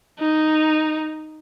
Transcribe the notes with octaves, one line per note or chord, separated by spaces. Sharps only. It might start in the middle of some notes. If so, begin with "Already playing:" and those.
D#4